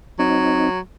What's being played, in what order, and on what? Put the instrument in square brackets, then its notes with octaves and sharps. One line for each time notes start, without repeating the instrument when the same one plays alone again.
[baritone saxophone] F#3 [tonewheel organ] C4 D#4